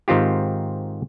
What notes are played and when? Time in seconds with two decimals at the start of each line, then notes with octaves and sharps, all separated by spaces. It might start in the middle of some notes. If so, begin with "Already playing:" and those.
0.08 G#2 D#3 C4 F4 G4